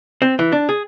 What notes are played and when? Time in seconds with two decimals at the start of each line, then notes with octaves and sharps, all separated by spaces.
0.22 C4
0.39 E3
0.52 D4
0.69 G#4